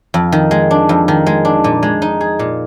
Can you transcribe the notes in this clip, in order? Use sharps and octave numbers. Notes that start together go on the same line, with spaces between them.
F2
D#3
G#3
D4
F2
D#3
G#3
D4
A#2
G#3
D#4
G#4
A#2